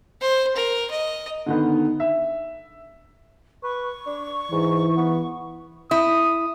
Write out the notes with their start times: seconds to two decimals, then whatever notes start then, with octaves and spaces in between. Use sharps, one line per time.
0.21 C5
0.56 A#4
0.91 D#5
1.46 D3 D#3 B3
2.00 E5
3.64 B4 C#6
4.06 D4
4.52 G#2 E3
4.97 B3
5.91 E4 D#6